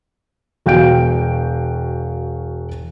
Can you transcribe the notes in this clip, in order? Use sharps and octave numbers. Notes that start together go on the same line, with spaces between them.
E1 F#4 F5 G5 G6 D7